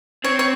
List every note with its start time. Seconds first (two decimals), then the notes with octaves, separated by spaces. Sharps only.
0.24 C4 C#5
0.39 C#5